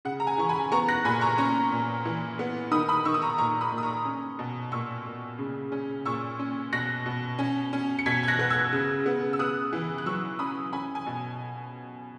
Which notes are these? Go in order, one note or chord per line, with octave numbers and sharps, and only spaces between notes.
C#3 F#5
A#5
G#5
E3 C#6
G#5 B5
B3 A#5 C#6
F#6 A#6
A#2 G#5 B5
A#5 C#6
C#4 A#5 C#6
A#2
E3
B3
D#3 B5 D#6
B5 D#6
D#3 C#6 E6
D#6
A#5 C#6
A#2 A#5 C#6
B5 D#6
A#2
D#6
A#5 C#6
C#4
B2
A#2 C#6 E6
A#2
C#3
C#4
A#2 C#6 E6
C#4
B2 F#6 A#6
B2
C#4
C#4
C#7
B2 G#6 B6
G#6
F#6 A#6
B3 F#6
E6 G#6
C#3
B3
E6
B3 D#6 F#6
E3
F#6
F#3 C#6 E6
C#4 B5 D#6
C#4 G#5 B5
G#5
B2